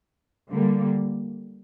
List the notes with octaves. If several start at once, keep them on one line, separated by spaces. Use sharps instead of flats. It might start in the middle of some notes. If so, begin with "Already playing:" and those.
D3 G3 A#3